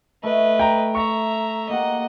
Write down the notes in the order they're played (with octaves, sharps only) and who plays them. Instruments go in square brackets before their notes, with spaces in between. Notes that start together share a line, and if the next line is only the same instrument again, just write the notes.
[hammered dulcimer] A3 [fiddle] B4 D#5
[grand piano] G5 A#5
[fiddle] E5 A#5 [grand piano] C#6
[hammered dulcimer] A#3 G4 [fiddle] D#5 F#5